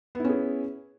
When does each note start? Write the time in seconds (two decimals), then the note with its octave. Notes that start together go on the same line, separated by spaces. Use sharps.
0.15 B3
0.20 E4
0.24 C#4
0.29 G#4